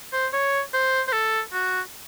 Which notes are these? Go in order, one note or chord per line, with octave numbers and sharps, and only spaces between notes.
C5
C#5
C5
C5
A4
F#4